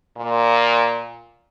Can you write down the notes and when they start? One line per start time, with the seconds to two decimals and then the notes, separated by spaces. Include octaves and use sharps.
0.17 A#2